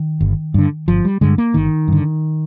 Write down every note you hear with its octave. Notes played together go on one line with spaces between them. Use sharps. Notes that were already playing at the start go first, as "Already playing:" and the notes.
Already playing: D#3
G1
G2 D3
G1 F3
G3
G2 D3 G#3
A#3
G1 D#3
G2 D3